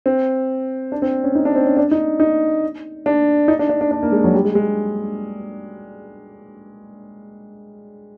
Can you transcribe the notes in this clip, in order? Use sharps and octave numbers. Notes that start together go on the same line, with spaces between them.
C4
D4
C4
C#4
D#4
D4
C4
C#4
D4
D#4
D#4
D4
D#4
D4
D4
D4
D4
A#3
G#3
F#3
G3
G#3
G#3